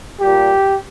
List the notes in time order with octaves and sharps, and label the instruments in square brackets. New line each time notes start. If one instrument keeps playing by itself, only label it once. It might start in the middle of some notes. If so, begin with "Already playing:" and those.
[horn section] A#2 G3 G4